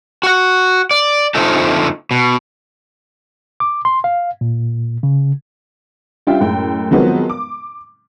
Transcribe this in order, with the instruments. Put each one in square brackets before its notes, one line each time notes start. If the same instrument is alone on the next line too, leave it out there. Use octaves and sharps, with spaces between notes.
[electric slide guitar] F#4 F#5
D5
F2 D3 F3 A3 D#4 A4
B2
[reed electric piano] D6
C6
F5
A#2
C#3
[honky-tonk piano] G3 C#4 D4 F4 E5 G5
F#2 A2 G#3 G5
D#3 F3 F#3 G#3 B3 C4
D6